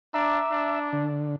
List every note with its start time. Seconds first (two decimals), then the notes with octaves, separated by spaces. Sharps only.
0.14 D4 E5 A#5 D6
0.51 D4
0.93 D3